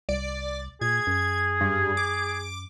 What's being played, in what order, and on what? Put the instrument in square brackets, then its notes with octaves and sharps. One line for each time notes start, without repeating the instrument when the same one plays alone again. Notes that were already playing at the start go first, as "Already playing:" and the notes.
[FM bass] C2 [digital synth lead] D5
[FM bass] A#2 [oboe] G#4 [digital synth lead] G#6
[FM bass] F#2
[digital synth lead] G2
D6